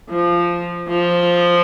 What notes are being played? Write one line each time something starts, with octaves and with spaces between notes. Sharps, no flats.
F3
F3